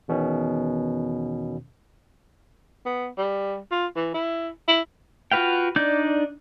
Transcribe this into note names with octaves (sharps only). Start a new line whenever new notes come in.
E2 B2 D#3 C#4
B3
G3
F4
E3
E4
E4
F4 F#4 B4 F5 G5
D4 D#4 D5 G6